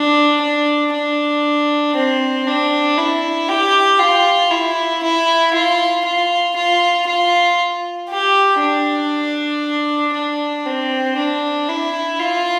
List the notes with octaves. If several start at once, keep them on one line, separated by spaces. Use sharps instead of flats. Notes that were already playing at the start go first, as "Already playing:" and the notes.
Already playing: D4
D4
D4
C4
D4
E4
G4
F4
E4
E4
F4
F4
F4
F4
G4
D4
D4
C4
D4
E4
F4